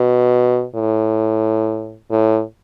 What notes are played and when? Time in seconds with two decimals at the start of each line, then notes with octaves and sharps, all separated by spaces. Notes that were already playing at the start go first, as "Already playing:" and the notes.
Already playing: B2
0.75 A2
2.11 A2